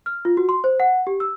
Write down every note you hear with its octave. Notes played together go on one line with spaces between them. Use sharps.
F6
F4
F#4
C6
C5
F#5
G4
E6